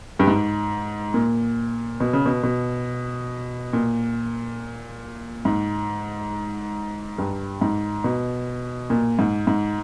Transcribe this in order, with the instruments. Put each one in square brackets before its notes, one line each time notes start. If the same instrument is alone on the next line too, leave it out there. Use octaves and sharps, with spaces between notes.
[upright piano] G2
G#2
A#2
B2
C#3
B2
B2
A#2
G#2
G2
G#2
B2
A#2
G#2
G#2